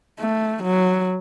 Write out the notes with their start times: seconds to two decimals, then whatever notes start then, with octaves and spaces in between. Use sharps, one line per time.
0.19 A3
0.64 F#3